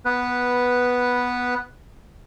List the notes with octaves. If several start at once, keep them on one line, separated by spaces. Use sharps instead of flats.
B3 B4